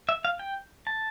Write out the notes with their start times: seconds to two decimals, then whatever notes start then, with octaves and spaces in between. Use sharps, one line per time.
0.09 E5
0.25 F5
0.39 G5
0.87 A5